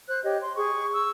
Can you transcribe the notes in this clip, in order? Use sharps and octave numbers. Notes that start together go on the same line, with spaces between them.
C5 F#6
G4 C#5 D#5
C6
G#4 C#6
C#6 E6